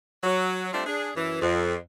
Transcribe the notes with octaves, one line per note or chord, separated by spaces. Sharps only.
F#3
G3 A3 C4 D4 F4
D4 G#4
F#2 E3
F2